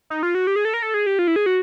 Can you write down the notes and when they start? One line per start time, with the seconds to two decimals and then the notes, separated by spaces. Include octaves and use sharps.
0.10 D#4
0.23 F4
0.35 F#4
0.47 G4
0.56 G#4
0.65 A4
0.74 A#4
0.82 A4
0.94 G#4
1.06 G4
1.19 F4
1.27 E4
1.36 G#4
1.46 F#4